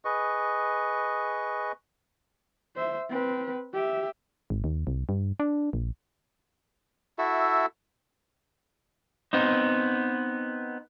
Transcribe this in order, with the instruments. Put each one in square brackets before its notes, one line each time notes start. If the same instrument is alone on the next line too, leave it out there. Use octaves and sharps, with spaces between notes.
[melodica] G#4 B4 D#5 C#6
[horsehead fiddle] C5 E5
C4 B4
G4 E5
[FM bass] G#1
D#2
C2
G2
D4
A#1
[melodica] E4 F#4 A4 E5
[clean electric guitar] B3 C4 D#4